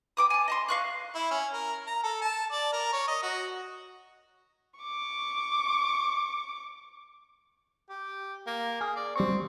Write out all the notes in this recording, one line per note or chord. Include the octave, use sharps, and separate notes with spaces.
G5 D6 D#6
G#5 A5
D#5 A5 C6
F5 C#6 F#6
E4
C#4
A#4
A#5
A4
A5
D5
A#4
C#5
D#5
F#4
C#6 D6
G4
A#3
G#4 G#5 F6
D5
G3 C4 C#6